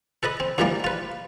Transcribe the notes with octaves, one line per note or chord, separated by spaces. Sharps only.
A4 B4 D#5 B5
C4
D#2 A#2 D#3 E3 G3 A#3
F4 B4